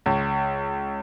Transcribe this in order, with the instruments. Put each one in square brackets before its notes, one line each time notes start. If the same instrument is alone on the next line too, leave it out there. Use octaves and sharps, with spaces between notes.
[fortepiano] C#2